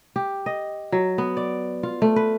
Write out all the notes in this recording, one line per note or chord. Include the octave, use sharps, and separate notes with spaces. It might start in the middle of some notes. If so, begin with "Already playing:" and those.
G4
D#5
F#3
B3
D5
F4
A3
B4